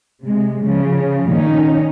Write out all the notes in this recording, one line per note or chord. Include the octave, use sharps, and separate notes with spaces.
C3 G#3
C#3 F3
A#2 D#3 C#4 D#4